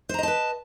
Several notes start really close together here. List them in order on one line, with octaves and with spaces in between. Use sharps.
C5 A#5 D#5 A5 B4